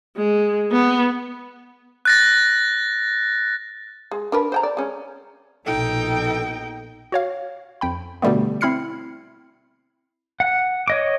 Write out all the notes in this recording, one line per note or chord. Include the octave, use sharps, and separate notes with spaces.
G#3
B3
F#6 A6 A#6
G#3
D4 A#4 B4
C5 G5 A#5
D5
G#3 C#4
A#1 B2 D#4 A4 G5
F#4 C#5 F5
F2 G5 B5
B2 D3 G3 A3 B3
C4 E4 B5 F6 C7 C#7
F#5
C#5 D#5 D6